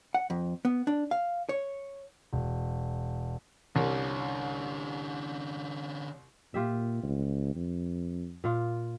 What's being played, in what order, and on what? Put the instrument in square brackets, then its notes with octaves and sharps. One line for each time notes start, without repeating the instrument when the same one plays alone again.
[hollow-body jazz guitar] F#5
F2
B3
D4
F5
C#5
[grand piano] E1
[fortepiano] C2 [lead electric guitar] D3 C#4
[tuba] A#2 [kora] F4 G4 E5
[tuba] C#2
F2
[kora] A#2 F4